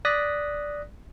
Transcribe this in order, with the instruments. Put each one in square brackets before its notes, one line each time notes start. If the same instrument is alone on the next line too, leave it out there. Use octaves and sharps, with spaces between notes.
[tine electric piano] D5 D#6 F#6 A#6 B6